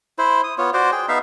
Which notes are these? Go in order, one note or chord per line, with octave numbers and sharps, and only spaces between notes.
E4 C5
D#6
B3 F4 C#5
F#4 C5 D5
G#4 G5
B3 D#4 E5 F5